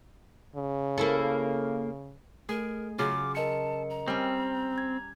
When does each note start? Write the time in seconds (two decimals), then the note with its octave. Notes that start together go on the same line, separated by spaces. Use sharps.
0.56 C#3
0.98 A#3 E4 A4
2.49 A3 G#4 A#4
2.99 C#3 F#3 F4 D6
3.35 A#4 D#5 A5 C#7
3.90 A#5
4.08 G3 C4 C#4
4.78 G#6